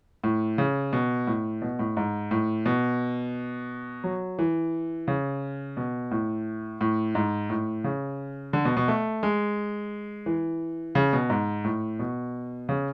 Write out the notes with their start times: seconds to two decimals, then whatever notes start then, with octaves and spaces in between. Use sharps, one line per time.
0.24 A2
0.58 C#3
0.93 B2
1.27 A2
1.62 B2
1.79 A2
1.97 G#2
2.31 A2
2.66 B2
4.04 F#3
4.39 E3
5.08 C#3
5.77 B2
6.11 A2
6.81 A2
7.15 G#2
7.50 A2
7.84 C#3
8.53 D3
8.65 B2
8.77 B2
8.88 A3
9.23 G#3
10.26 E3
10.95 C#3
11.13 B2
11.30 G#2
11.64 A2
11.99 B2
12.69 C#3